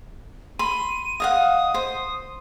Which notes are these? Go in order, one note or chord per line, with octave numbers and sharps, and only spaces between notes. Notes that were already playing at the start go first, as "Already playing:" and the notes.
B5 C6 D#7
D#5 F5 F#5 D#6
C5